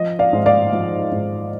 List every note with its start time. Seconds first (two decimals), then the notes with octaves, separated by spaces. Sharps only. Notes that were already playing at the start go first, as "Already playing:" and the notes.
Already playing: F3 D#5
0.19 D5 F5
0.33 G#2
0.46 D5 F5
0.73 F3
1.12 G#2